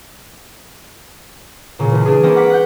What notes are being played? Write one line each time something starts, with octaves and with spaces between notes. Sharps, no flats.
A#2 C#3
C#2 E3
D4 G#4
E3 A#3 C4 C#4 A#4 D#5
F#5 D6 B6 C#7
F#5 F#6 G6